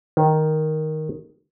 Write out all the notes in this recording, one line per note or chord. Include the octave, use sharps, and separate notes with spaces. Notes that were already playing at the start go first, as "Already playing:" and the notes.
D#3